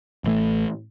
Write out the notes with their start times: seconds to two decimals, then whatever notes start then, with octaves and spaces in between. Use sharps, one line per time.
0.24 A1 E3 A3